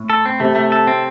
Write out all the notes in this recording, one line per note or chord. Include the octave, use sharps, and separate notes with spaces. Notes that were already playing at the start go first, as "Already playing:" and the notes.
Already playing: A2
A4
C4
C3 A3
A3
A4
C4